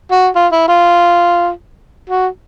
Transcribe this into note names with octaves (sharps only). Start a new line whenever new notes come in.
F#4
F4
E4
F4
F#4